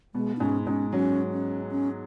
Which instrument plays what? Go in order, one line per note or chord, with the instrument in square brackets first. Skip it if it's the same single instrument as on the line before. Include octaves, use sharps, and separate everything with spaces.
[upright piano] B2 B3 [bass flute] G#3
[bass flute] D#4
[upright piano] G#2 G#3 [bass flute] C#4
[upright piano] G#2 G#3 [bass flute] C#4
[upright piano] F#3 [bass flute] C#4
[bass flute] C#4
C#4